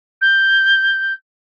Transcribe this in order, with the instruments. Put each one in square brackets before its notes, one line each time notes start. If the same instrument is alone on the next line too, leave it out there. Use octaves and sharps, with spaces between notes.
[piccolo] G6